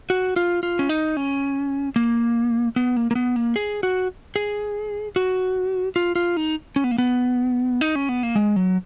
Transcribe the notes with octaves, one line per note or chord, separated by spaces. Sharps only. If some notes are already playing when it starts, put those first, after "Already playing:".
F#4
F4
F4
C#4
D#4
C#4
A#3
B3
A#3
A#3
B3
A#3
G#4
F#4
G#4
F#4
F4
F4
D#4
C#4
B3
A#3
B3
D#4
C#4
B3
A#3
G#3
F#3